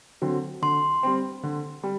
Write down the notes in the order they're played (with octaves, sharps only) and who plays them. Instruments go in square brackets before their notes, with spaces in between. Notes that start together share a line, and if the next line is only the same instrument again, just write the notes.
[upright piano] D3 F#3 C4
[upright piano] D3 [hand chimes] C6
[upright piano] G3 C4
D3
G3